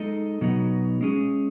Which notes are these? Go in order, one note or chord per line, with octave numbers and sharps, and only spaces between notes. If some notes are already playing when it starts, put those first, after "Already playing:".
Already playing: G#3 D#4 A4 D#5
B2 F#3 B3 D#4
G#3 C#4 G#4